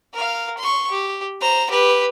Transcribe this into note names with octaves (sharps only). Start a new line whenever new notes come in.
A#4 F5
C6 C#6
G4
C5 A#5
G4 B4